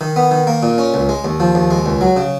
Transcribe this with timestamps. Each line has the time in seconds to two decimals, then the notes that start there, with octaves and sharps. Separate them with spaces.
0.01 D#3
0.16 B3
0.31 D#3
0.47 A#3
0.63 A#2
0.78 C#4
0.94 C#2
1.09 G#3
1.25 D#2
1.40 F3
1.55 D#2
1.71 G#3
1.86 C#2
2.01 F#3
2.17 C#3